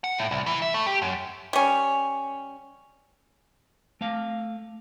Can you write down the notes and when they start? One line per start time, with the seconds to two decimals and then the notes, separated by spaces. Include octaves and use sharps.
0.04 F#5
0.18 A2
0.31 C2
0.46 E3
0.62 E5
0.74 A3
0.87 G4
1.02 F#2
1.53 G3 C#4
4.01 A3 F5